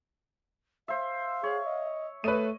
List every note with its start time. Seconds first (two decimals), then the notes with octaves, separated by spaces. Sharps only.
0.88 C5 E5 F5
1.43 G#4 C#5
1.66 D#5
2.24 A3 B4 C#5 D#5 D#7